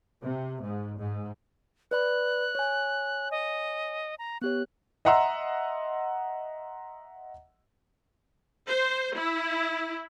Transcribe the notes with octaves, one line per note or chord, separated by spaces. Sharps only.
C3
G#2
G#2
B4 D5 B5 F#6
C#5 G#5
D#5
A#5
B3 G4 C#5 F#6
D#5 E5 F#5 A#5 C6 E6
C5
E4